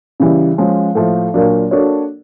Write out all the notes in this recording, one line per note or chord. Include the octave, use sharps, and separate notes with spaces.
C#3 E3 G3
F3 G#3 C#4
A2 F3 A3
A#2 F#3 A#3 D4
A#3 D4 F#4 A4 C#5